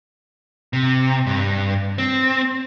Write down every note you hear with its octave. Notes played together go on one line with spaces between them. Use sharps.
C3
G2
C4